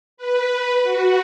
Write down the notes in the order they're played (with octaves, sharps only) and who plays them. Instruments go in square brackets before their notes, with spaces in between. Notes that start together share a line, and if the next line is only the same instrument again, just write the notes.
[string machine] B4
F#4